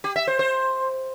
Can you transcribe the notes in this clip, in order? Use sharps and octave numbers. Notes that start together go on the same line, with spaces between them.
G4
E5
C5
C5